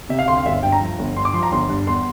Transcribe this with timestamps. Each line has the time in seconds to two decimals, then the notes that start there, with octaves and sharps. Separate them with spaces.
0.09 C3 E5
0.19 F5
0.28 D2 C6
0.37 F5
0.46 G1 E5
0.63 G2 G5
0.72 A#5
0.81 F3
0.99 G1
1.16 G2 C6
1.25 D6
1.34 F3 C6
1.43 A#5
1.52 G1 C6
1.69 G2
1.87 E2 C6